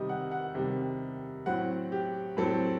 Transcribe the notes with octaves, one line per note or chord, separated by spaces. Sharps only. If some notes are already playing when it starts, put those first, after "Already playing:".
Already playing: C3 D#3 G3 D#5
F#5
F#5
C3 D#3 G3
A2 F#3 C4 F#5
G4
A2 F#3 C4 A4